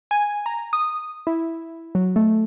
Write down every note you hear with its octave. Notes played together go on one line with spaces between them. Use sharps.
G#5
A#5
D#6
E4
F#3
A3